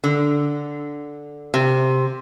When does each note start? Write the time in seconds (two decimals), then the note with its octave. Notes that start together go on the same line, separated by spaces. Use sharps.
0.04 D3
1.54 C3